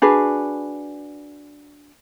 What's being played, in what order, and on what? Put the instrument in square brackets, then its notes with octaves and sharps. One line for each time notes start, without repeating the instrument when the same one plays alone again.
[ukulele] D4 F#4 G#4 B4